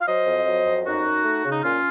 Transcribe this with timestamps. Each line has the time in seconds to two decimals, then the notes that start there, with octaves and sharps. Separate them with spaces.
0.01 F5
0.06 F#3 C5 D#5
0.26 F2
0.46 F#3
0.65 F2
0.85 F#2 D#4 F#4
1.04 F#2
1.24 A3
1.44 C#3
1.51 D#4
1.63 A#2 C#4 F4